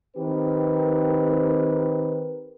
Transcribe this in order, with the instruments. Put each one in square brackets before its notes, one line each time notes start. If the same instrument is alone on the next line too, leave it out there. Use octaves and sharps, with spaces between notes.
[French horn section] D#3 C4 G4 A#4 B4